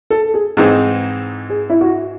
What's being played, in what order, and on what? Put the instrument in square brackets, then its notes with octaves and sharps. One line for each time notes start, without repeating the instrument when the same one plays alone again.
[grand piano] A4
G#4
[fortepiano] G#2 E3 C4 D#4 [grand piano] G#4
[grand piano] G#4
E4
F#4